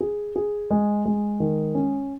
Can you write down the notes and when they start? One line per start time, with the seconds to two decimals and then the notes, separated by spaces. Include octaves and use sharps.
0.01 G#4
0.36 G#4
0.71 G#3
1.05 G#3
1.40 D#3
1.75 C#4